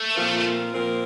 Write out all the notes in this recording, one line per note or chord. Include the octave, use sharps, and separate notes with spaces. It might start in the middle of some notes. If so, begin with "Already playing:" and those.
Already playing: A3
A#2 F3 C4 F4 A#4
A#2 F3 C4 F4 A#4